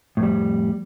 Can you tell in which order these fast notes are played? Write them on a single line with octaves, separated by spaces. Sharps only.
A2 F2 G3